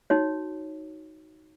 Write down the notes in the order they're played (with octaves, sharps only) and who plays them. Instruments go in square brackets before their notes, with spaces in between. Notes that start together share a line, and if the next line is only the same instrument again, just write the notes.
[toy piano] D#4 F#4 C#5